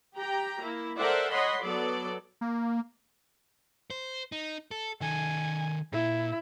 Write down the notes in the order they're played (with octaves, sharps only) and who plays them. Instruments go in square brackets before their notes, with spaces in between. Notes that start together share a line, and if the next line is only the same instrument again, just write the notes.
[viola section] G4 G5 A#5
A#3 E4
A4 A#4 C5 D5 E5 F#5
C#5 D#5 F#5 B5 C6
F#3 B3 A4 D5
[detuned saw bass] A#3
[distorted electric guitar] C5
D#4
A4
[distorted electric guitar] D#3 A4 [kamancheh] G#5
[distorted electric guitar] A#2 [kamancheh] E4